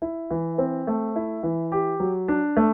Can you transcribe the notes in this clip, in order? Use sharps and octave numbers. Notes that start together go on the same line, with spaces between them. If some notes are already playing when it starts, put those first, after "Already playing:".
E4
E3
C4
A3
E4
E3
G4
F#3
D4
A3